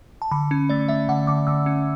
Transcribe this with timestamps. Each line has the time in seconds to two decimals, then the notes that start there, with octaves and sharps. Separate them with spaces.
0.22 A5
0.31 D3 B5
0.51 C#4
0.69 A3 D5
0.89 A3 E5
1.09 D3 F#5
1.27 D3 D6
1.47 D3 E6
1.66 C#4